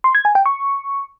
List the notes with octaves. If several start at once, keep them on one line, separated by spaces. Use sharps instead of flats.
C6
G#6
G#5
G5
C#6